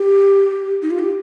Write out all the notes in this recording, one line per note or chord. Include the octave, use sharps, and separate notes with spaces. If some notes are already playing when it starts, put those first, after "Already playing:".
Already playing: G4
D#4
F4
G4